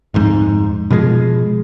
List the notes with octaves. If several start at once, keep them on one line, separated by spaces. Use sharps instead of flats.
D1 F2 G#2
B2 F3 G3 G#3